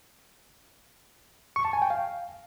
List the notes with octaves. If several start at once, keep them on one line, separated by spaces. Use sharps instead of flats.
C#6
A5
G#5
G5
F5